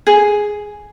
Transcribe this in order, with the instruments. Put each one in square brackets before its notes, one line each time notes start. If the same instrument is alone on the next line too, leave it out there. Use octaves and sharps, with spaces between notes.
[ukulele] G#4